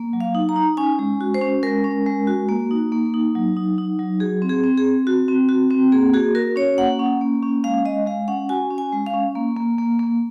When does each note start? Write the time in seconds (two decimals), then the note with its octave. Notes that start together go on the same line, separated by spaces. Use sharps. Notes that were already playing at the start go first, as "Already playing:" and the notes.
Already playing: A#3
0.13 F#3
0.21 F5
0.35 D#4
0.49 A#5
0.56 D#4
0.77 C#4 G#5
0.99 G#3
1.21 F#4
1.34 C5
1.42 C#4
1.63 G#3 A#4
1.84 C#4
2.06 G#3
2.27 F#4
2.49 A#3
2.71 D#4
2.92 A#3
3.14 D#4
3.35 F#3
3.56 D#4
3.78 D#4
3.99 F#3
4.20 F#4 G#4
4.42 C4
4.49 G#4
4.64 C4
4.78 G#4
4.85 C4
5.07 F#4
5.28 C4
5.49 F#4
5.71 C4
5.92 A#3 G#4
6.14 F#4 G#4
6.35 F#4 A#4
6.56 C#4 C#5
6.78 A#3 F#5
6.99 C#4
7.21 A#3
7.43 C#4
7.64 G#3 F5
7.85 G#3 D#5
8.06 G#3 F5
8.28 C#4 F#5
8.49 F#4 G#5
8.71 C#4
8.78 G#5
8.92 G#3
9.06 F5
9.14 C#4
9.35 A#3
9.57 A#3
9.78 A#3
9.99 A#3